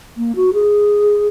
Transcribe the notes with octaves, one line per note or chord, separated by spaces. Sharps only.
A#3
F#4
G#4